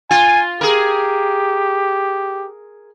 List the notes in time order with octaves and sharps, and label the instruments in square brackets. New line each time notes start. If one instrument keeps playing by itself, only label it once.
[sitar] F4 [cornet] G#5
[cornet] G4 [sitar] G#4 A#4